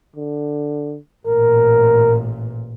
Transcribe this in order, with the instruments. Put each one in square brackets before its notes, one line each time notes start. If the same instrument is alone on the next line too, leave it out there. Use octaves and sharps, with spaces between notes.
[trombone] D3
[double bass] A1 A#2 [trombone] A#4